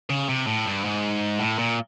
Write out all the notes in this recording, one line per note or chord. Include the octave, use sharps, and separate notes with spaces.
C#3
C3
A2
G2
G#2
A2
A#2